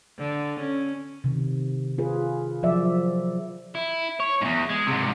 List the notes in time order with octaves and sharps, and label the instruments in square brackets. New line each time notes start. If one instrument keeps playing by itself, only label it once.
[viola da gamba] D3
C#4
[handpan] C3 D#3
F4 G#4 B4
F3 F#3 D5 E5
[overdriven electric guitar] E4
C#5
E2 G#2
G#3
G#2 C3